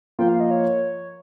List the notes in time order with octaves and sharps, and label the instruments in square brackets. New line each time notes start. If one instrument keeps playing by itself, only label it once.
[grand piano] F3 A#3 F4 [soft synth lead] G5
[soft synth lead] F5
D#5
C#5